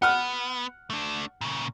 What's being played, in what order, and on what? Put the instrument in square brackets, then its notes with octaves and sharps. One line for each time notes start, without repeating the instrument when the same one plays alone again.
[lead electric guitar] B3 [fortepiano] F#5 F6
[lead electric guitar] A3 D4
A#2 C#3